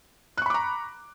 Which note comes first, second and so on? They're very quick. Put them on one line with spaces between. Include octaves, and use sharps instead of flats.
F#6 C#6 B5 D6 A#5